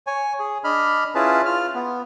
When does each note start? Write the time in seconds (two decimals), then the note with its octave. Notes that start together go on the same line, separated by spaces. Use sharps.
0.07 C#5 G#5
0.39 G#4
0.64 D4 D#5 B5 F6
1.15 C#4 E4 F4 G#4 B4 A5
1.46 F4 F6
1.75 B3